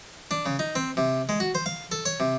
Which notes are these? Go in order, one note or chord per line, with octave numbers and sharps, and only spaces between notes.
D4
C#3
D#4
C4
C3
G#3
F#4
C5
F5
A4
C#5
C3